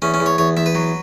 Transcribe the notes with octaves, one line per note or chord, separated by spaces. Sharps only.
E2 C#4
C#4
E2
C#5
E2 C#5
E2 E5
B4
F#3